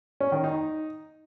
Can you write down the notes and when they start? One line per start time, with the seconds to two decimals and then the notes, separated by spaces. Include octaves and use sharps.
0.20 C#4
0.32 D#3
0.44 D#4